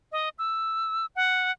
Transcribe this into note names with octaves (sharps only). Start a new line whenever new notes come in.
D#5
E6
F#5